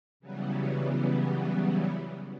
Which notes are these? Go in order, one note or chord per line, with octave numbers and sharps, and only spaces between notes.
C#3 E3 F#3 G3 B3